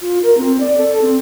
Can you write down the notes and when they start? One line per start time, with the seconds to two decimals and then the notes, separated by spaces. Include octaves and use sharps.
0.01 F4
0.23 A#4
0.37 C4
0.60 D5
0.78 A4
1.01 C4